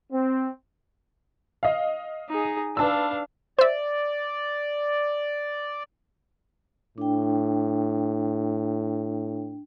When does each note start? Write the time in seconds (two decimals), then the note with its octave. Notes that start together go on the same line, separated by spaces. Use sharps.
0.12 C4
1.63 D#5 F5
2.29 D#4 G#4
2.77 D4 B4 F5 A5 E6
3.59 C5 D5 E5
6.98 A2 D4 G5